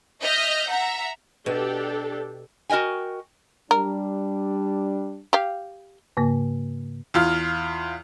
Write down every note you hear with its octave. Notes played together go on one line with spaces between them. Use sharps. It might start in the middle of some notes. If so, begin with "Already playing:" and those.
D#5 E5 F6 G6 A#6
E5 F#5 A#5
B2 D4 G4 A4
F#4 A#4 D#5 G5 G#5
G3 D4 A#4
G4 F5
G#2 C#3 A#3
E2 F4 F6